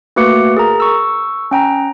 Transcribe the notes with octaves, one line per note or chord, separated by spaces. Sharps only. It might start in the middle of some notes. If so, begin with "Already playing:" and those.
A3 A#3 F#4 B4 D6 C#7
G#4 A#4 A#5
C#6 E6
C#4 G5 A#5